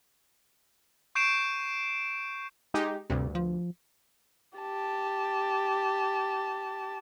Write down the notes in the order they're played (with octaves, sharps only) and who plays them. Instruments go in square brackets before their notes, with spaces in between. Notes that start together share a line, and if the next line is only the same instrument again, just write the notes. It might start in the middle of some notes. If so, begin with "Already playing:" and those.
[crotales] C#6 G6 C7 D7 E7
[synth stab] G#3 D#4 G4
[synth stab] D2 G2 [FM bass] C3
[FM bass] F3
[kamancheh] G4 A5